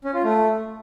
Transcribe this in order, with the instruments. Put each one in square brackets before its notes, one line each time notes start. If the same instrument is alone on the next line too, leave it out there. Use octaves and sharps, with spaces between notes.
[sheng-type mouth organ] C#4
F4
A3